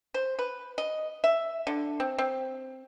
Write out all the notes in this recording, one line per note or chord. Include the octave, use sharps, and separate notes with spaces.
C5
B4
D#5
E5
D3
C4
C4